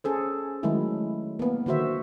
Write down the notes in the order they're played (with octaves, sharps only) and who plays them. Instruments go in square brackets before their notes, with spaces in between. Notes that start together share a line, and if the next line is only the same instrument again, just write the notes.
[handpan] C#4 G#4 A4 C5
D#3 F#3 G#3 A3 E4
A#3 B3
D3 D#3 F#4 C5 E5